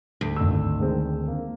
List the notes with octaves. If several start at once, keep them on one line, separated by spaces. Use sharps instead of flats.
D2
G#1 E6
D#3 G#3 C4
A#3